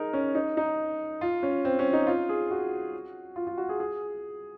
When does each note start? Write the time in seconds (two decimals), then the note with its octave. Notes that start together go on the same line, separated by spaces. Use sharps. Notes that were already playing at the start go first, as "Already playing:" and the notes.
Already playing: D#4 G#4 A#4
0.13 C#4
0.35 D#4
0.57 D#4
1.21 F4
1.43 C#4
1.65 C4
1.79 C#4
1.93 D#4
2.07 F4
2.29 G#4
2.51 F#4
3.36 F4
3.47 F4
3.58 F#4
3.69 G#4
3.80 G#4